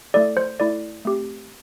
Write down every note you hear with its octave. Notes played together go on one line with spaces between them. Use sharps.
A3 E4 A4 D5
C5
A3 E4 A4 D5
A3 C4 G4